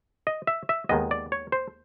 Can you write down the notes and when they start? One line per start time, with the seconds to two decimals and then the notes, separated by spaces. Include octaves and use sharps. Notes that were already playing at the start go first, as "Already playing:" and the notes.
0.27 D#5
0.47 E5
0.69 E5
0.89 D#2 D#3 G#3 B3 D#5
1.11 D5
1.32 C#5
1.52 C5